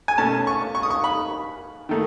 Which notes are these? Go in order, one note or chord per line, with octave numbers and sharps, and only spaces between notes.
G#5
B2 A3 C#4 A5
C#6
C#6
D#6
C#6
B5
D#3 A3 D#4